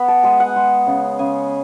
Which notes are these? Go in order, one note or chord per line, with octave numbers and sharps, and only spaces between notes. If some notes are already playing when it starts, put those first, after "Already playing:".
Already playing: B3 B5
A5
G#3 G#5
F#5
G#3
C#3
C#3 G#5